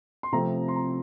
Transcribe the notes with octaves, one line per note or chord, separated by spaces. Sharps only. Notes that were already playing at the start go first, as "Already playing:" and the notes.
C6
C3 F3 A3 C4 A#5
C6
A#5